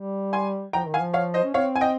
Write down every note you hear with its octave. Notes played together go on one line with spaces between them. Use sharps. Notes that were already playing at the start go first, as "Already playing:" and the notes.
Already playing: G3
G#5 C6
F3 G5 A#5
D#3
F5 G#5
F3
C#5 F5
C5 D#5
C#4
C4 C#5 F5
G#5
D#5 G5